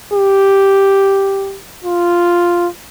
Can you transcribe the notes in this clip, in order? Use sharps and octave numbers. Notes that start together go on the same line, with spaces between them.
G4
F4